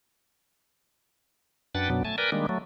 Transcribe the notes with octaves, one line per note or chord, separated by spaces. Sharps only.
F#2 D4 B4 F#5 G5 A6
F#2 B2 F#3 B3 D4
A3 G#5 A5
A#4 B4 D5 G5 G#5 A#5
D#3 G3 G#3 A#3 D4
F#3 A3